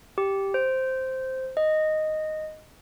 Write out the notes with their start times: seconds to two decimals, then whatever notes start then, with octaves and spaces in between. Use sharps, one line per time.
0.18 G4
0.54 C5
1.57 D#5